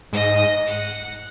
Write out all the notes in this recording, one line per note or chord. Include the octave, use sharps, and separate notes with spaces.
G#2 D#5
F#5